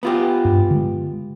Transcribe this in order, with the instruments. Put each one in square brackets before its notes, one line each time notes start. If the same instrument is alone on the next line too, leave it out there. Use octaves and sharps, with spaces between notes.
[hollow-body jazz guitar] B3 F4 G4
[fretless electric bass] G2
D3 G#3